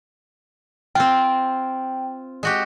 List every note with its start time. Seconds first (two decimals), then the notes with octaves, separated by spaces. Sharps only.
0.95 C4 F4 G5
2.43 G#3 F#4 G4